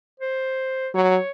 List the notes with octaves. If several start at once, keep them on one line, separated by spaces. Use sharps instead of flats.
C5
F#3 C#5